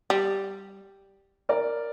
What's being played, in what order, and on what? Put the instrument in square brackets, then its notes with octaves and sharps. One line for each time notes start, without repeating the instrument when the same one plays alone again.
[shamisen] G3
[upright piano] A#4 D5